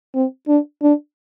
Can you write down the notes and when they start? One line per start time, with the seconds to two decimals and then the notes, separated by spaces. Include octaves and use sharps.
0.15 C4
0.48 D4
0.83 D4